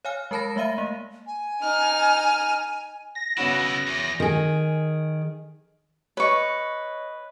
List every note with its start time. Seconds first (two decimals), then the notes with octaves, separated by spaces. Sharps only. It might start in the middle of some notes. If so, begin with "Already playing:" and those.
0.05 C#5 F5 G#5 F6
0.31 G#3 A#4 A5 B5 A#6
0.56 G#3 A3 E5 F5 D#7
0.78 A#3
1.27 G#5
1.62 D#4 F6
3.15 A#6
3.37 C#3 B3 C#4 E4 F#4
3.87 E2
4.20 D#3 G#4
6.17 B4 C#5 D#5 C#6